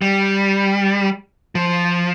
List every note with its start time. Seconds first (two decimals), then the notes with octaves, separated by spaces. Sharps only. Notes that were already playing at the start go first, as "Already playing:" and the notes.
0.02 G3
1.55 F3